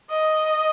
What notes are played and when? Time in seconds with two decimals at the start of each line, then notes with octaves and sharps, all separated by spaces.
0.10 D#5